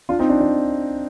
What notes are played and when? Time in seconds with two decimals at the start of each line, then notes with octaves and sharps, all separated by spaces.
0.09 D4 F4
0.19 C4 D#4
0.29 D4
0.41 D4